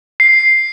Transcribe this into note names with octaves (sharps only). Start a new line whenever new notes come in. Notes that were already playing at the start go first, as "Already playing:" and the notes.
C7